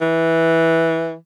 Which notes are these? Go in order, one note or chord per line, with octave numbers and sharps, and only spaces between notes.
E3